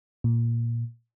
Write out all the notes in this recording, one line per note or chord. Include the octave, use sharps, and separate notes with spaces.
A#2